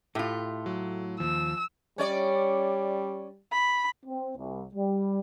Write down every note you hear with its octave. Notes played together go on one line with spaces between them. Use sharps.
A2 A3 F4 G4
F#3
D#2 F3 E6
G3 C#4 C#5 D5
B5
C4
C2
G3